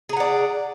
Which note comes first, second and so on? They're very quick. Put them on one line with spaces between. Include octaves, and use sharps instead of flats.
G#4 A#5 F#5 D5